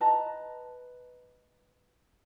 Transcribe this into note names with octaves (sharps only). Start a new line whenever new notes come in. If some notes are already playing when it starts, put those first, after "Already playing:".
B4 D#5 A5 A#5